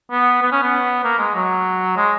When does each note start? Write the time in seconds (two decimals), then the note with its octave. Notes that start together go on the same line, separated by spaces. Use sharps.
0.11 B3
0.43 B3
0.52 C#4
0.63 B3
1.04 A#3
1.19 G#3
1.35 F#3
1.97 G#3